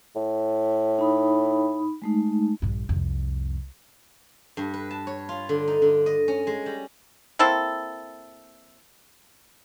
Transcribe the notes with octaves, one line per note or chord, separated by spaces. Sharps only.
A2
D#4 B5 D#6
G#3 A3 D#4
A#1 G2
C2 F2
G2
B4
A5
C#5
F4
D3
D#4
D3
D#5
C#4
G#3
G3
A#3 C4 E4 A4